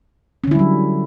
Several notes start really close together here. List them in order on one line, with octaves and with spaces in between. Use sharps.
C#4 D3 E4 G3 F#3